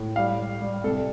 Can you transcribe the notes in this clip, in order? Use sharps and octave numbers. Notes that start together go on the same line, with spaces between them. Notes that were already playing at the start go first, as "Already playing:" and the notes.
Already playing: A2
G3 F5
G3
G3
C2 A4